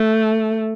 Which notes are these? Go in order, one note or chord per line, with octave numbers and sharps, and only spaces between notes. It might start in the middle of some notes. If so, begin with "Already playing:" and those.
Already playing: A3